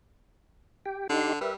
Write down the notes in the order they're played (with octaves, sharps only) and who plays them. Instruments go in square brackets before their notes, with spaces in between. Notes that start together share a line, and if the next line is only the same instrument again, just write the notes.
[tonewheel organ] G4 G5
[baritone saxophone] D3 [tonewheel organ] D#4 G4 C6
[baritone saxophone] G3 [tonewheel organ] A#4 B4 E5